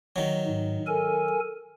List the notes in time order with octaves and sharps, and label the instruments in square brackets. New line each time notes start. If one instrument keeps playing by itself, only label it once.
[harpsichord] D#3 F#3
[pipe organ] G#2
A4 A#4 G#5